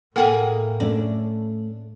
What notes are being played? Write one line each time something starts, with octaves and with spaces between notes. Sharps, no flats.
A2 A#3 G#4 A4 F#5 G5
A3 C#4 D4